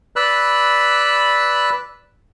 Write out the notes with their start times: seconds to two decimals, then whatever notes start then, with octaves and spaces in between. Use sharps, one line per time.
0.16 B4 D5 B5 E6 F#6